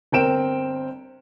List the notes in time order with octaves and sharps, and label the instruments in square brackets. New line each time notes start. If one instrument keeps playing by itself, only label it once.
[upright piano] G1 C4 A#4 G5 D7 E7